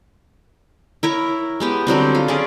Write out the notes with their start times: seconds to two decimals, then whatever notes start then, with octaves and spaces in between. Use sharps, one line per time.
1.03 E4 A#4 C#5
1.60 G#3 B3 G4
1.87 D3 F#3 G3 C4
2.15 F4
2.28 C#4 G#4 D5